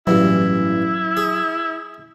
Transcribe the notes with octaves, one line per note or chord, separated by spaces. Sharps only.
A1 G2 E3 F#3 E4
G#4